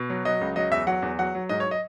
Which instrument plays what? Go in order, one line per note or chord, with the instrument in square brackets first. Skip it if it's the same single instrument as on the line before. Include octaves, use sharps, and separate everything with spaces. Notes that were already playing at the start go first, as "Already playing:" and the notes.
Already playing: [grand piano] B2
F#3
F#3 D#5
C#2
F#3 D#5
E2 E5
F#3 F#5
E2
F#3 F#5
F#3
G#2 D#5
C#5
D#5